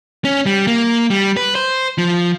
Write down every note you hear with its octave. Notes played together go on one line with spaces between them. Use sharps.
C#4
G3
A#3
G3
B4
C5
F3